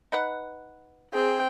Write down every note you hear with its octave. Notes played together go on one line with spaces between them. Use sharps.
D#4 B4 F#5
C4 G#4 G5